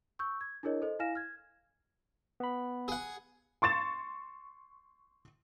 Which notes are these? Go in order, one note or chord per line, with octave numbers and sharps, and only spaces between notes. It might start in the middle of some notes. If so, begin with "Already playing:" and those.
C#6 E6 G6
G#6
D4 E4 G#4 A#4 C#5 D#5
A4 C5 D#5
E4 F5 G#5 F6 A#6 E7
F6 G#6
B3 B5
G#4 F#5
C6 C#6 A6 E7